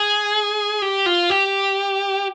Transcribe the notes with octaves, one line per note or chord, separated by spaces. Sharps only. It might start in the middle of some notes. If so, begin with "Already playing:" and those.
Already playing: G#4
G4
F4
G4